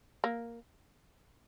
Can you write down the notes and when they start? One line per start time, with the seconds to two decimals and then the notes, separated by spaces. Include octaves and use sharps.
0.24 A#3